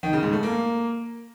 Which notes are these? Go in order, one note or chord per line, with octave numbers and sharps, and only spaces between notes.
D#3
C#3
G#2
A3
A#3